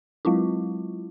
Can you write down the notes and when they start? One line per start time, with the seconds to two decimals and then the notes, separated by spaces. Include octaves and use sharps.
0.25 F#3 G#3 C4 E4 F4